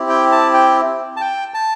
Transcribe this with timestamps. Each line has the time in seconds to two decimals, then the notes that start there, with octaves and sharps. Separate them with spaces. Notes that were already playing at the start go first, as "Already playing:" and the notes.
Already playing: C4 E4 G4
0.09 G5
0.32 A5
0.54 G5
1.17 A5
1.21 G5
1.54 A5